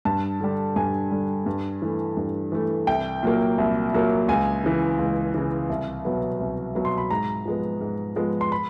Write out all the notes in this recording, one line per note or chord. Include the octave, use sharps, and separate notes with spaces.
G2 A5
D3 G3
G2 G#5
D3 G3
G2
E3 A3
G2
E3 A3
C2 G5
A#2 F#3 A#3
C2
A#2 F#3 A#3
C#2 G#5
C#3 E3
C#2
C#3 E3
C2
B2 F#3 B3
C2
B2 F#3 B3
C6
B5
G#2 A#5
F3 G#3 B3
G#2
F3 G#3 B3
C6
B5